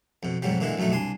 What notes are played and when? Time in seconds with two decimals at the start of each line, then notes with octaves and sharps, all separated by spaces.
0.23 F2 B2
0.42 F2 G#2 B2 F#3 G3
0.60 A#2 D3 E3 G#3
0.78 A#1 F#2 B2 A3 D#4
0.91 C2 D4 G#5 C6